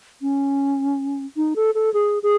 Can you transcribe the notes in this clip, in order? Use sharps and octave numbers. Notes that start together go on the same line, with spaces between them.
C#4
D#4
A4
A4
G#4
G#4